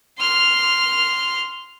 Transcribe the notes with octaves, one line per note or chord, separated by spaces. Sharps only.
C6 F6